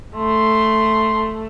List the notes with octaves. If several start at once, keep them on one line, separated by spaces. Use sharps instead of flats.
A3 C6